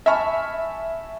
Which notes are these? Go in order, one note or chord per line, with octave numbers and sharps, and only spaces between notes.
E5 G#5 A5 B5 C#6 F6